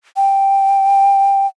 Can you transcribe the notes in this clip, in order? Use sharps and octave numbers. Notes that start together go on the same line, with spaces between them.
G5